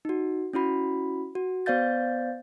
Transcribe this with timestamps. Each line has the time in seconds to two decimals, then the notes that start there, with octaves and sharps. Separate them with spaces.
0.05 D#4 F#4
0.53 C#4 E4 F#4 B5
1.35 F#4
1.66 B3 C5 D5 F5 G6 A6